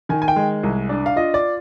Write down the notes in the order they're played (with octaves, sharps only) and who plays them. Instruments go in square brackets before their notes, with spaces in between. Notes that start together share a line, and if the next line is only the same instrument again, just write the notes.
[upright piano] D#3 [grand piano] G#5
[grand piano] G#5
G5
[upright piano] G#3
C2
D4
[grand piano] F5
[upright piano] F4 [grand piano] D#5
[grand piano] D5